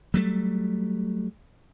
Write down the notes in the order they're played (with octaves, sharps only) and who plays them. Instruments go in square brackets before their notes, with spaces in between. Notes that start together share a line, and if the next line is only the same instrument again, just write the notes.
[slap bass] F#3 G3 A3